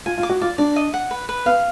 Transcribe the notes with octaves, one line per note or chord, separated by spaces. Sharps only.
F4 G#5
F4
D6
F#4
F4 D5
D4 D5
D#5
F#5
B4
B4
B3 F5